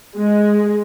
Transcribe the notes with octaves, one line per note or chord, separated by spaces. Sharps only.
G#3